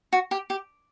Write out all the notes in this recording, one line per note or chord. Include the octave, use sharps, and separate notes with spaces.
F#4
G4
G4